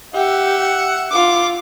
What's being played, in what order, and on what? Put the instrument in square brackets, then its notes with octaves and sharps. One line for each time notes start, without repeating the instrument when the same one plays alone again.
[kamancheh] G4 [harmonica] E5 F#5
[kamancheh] F4 D6